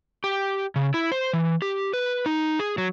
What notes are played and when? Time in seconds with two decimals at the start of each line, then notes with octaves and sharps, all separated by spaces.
0.24 G4
0.76 C#3
0.94 E4
1.12 C5
1.33 E3
1.62 G4
1.94 B4
2.26 D#4
2.59 G#4
2.78 F#3